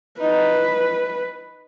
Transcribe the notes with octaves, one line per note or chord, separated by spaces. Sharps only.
D#4 B4